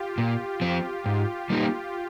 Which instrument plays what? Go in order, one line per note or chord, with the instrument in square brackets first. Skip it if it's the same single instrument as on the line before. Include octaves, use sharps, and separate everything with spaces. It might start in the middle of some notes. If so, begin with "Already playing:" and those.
Already playing: [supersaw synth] F4 G4
[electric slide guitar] A#2
F3 C4
G#2
G3 A#3 D#4 G4